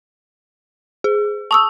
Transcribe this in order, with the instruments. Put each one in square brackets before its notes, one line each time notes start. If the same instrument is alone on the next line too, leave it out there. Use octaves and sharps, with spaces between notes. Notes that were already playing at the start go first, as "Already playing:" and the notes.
[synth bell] G#4
[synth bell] A5 [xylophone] C#6 D#6 E6